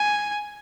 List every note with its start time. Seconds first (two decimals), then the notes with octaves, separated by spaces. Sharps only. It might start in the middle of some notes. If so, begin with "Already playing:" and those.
Already playing: G#5